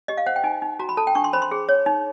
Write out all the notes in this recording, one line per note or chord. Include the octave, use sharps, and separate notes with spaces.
G4 D#5
F5
C5 F#5
G5
D#4 G#5
D#4
F#4 A#5
B5
A4 A5
G5
D4 C#6
C6
C5 B5
C6
G#4
C#5
D#4